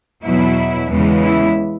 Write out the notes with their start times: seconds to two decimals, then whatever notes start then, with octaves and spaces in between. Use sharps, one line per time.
0.23 E2 B2 F#3 E4
0.89 E2 C#3 E3 G#3
1.23 E4